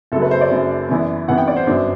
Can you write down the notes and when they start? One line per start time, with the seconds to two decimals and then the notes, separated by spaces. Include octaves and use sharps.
0.12 F#1 F#2 F#3 A4
0.22 B4
0.31 C5
0.41 D5
0.51 F#1 F#2 F#3
0.89 F#2 E3 B3 E4
1.28 F#2 E3 B3 E4 F#5
1.38 G5
1.48 D5
1.56 C5
1.67 G1 F#2 F#3 B3 D4